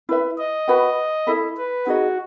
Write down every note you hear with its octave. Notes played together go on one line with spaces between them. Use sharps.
E4 B4 E5
D#5
F#4 B4 F#5 B5
E4 A4 E5 B5
B4
D#4 F#4 G#4 D#5